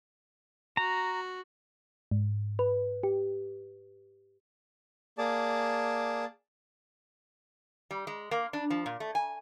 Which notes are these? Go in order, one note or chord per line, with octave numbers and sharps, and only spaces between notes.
F#4 A#5
G#2
B4
G4
A#3 G#4 D5 A5
G3
G#3
A#3
D4
F3
A#2
A3
G#5